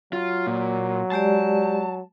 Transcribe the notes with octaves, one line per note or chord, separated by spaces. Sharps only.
F#3 F4
A#2
G#3 G4 D5 A5